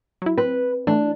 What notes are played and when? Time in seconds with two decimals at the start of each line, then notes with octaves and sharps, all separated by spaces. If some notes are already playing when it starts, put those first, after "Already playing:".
0.22 F#3 E4
0.38 C4 B4
0.87 E3 A3 D4